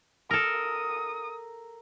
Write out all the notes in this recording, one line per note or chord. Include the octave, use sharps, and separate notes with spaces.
A4 A#4 D#6